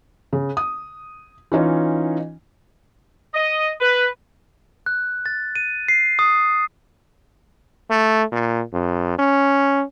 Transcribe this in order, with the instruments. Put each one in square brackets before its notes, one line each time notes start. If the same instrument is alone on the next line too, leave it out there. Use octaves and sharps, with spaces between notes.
[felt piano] C#3
D#6
E3 C#4 D#4 F4
[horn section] D#5
B4
[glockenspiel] F#6
A6
D#7
C7
D#6
[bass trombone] A3
A#2
F2
C#4